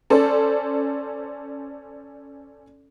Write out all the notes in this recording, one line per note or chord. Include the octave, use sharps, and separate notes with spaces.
C#4 A4 C5 D5